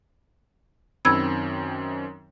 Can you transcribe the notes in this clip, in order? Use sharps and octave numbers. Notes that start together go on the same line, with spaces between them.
F#2 D#3 C4 B5 E6 G#6